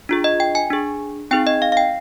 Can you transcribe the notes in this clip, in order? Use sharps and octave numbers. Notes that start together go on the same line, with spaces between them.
D4 F4 G#4
D#5
G5
G#5
D4 G#4
C4 D#4 G#4 G5
D#5
F5
F5
G5